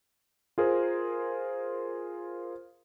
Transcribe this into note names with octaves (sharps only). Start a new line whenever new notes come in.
F4 G#4 A#4 C5